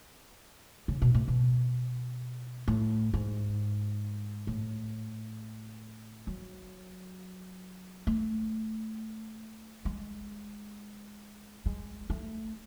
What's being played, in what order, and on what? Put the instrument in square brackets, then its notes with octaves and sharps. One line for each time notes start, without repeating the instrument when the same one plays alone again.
[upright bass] C#3
B2
A2
B2
A2
G#2
A2
F#3
A3
G#3
G#3
A3